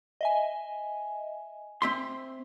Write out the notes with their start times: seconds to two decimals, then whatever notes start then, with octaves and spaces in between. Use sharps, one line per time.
0.21 D#5 E5 G#5
1.82 C4 E5 C6